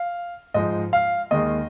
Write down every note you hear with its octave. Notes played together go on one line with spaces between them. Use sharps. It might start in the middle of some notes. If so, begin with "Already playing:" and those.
Already playing: F5
G#2 F3 G#3 D#5
F5
D#2 D#3 G#3 D#5